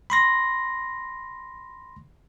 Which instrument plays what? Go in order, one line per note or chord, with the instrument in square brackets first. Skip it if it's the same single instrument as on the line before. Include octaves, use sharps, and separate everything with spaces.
[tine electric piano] B5 C6 A#6